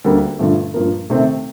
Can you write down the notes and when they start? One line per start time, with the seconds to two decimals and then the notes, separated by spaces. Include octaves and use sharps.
0.05 D2 D3 G3 A#3
0.39 G2 D3 F3 A3
0.74 G2 F3 A#3
1.10 C3 D#3 A3 C4